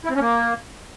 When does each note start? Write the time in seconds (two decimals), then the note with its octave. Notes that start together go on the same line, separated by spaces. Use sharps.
0.05 E4
0.10 C4
0.15 C#4
0.21 A#3